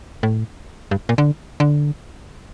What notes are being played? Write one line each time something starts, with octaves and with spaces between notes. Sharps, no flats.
A2
G2
A#2
D3
D3